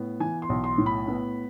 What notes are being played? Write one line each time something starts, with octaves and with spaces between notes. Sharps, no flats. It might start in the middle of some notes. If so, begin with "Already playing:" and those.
Already playing: A2 B3
E3 G#5
C6
B1
C6
A2
B5
B3